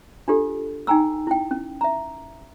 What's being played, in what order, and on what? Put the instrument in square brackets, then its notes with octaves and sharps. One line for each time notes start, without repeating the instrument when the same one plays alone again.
[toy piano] D4 F4 G4 A4
D#4 G5 G#5 A#5 E6
E4 G5
C#4
E5 A#5